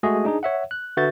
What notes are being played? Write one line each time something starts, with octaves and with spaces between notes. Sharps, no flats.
G#3 A3 F#4 G#4 D#5
D4 D#4 G#4
C#5 E5 F#5
F#6
D3 F#4 B4 E5 G6 A6